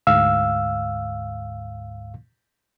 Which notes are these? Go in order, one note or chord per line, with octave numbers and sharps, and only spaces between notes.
D2 G#2 F5 E6